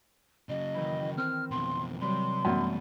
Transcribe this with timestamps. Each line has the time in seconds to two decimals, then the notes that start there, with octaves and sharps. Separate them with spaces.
0.49 C#3 F#3 D#5
0.74 D#3 E3 E4
1.17 C4 A#4 F6
1.51 F2 B2 C6
2.01 C3 F#3 G3 C6
2.45 C2 F#2 E3 G3 A3 B3